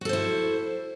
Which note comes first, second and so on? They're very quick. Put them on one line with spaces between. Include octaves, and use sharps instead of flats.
F#4 A4 C5 E4